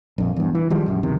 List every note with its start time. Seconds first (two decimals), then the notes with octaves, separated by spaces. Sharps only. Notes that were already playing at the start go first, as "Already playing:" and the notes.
0.18 A#1 F2
0.36 E2 G2
0.55 E3
0.70 D#3 F3 G3 G#3
0.86 A#1 F#2
1.03 F#1 D2 C3 D#3